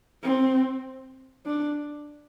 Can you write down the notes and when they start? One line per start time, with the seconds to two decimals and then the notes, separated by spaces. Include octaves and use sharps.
0.23 C4
1.46 D4